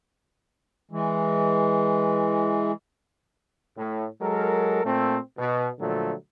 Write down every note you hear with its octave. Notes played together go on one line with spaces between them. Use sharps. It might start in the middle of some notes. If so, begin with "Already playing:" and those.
E3 G#3
A2
F#3 G#3 A4 A#4
A#2 A3 C4
B2
A#2 D3 F3 F#3 A3